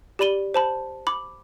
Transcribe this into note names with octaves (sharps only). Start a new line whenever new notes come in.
G4 D5 B5 D#7 G7
C5 A5 B5
B5 D6